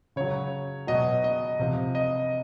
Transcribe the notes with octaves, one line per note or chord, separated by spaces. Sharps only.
C#3 F#3 C#5
B2 F#3 D#5
D#5
C3 F3
D#5